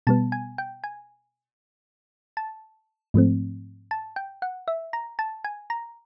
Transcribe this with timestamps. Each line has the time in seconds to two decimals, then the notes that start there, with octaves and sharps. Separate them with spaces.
0.07 B2 G3 B3 A5
0.32 G#5
0.58 G5
0.84 G#5
2.37 A5
3.14 G#2 F3 A3 C4
3.91 A5
4.16 G5
4.42 F#5
4.68 E5
4.93 A#5
5.19 A5
5.44 G#5
5.70 A#5